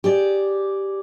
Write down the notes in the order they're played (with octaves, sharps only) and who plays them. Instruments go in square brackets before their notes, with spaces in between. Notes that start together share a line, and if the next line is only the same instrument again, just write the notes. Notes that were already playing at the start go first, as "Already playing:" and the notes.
[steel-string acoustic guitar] G4 G#4 D5